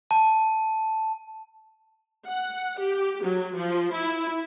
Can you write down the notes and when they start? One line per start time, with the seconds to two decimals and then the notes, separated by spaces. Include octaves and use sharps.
0.11 A5
2.27 F#5
2.78 G4
3.23 F#3
3.56 F3
3.93 E4